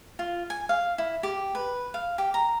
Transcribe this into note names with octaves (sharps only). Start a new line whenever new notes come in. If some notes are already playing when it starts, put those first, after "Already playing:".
F4
G#5
F5
E4
G4
B4
F5
G4
A#5